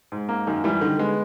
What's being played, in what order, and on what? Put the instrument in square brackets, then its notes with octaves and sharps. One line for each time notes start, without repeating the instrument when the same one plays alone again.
[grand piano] G#2
A#3
[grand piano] F#2 [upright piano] D#3
[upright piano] E3 [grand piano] G3
[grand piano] D3 [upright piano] D#3
[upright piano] G#3 [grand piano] B3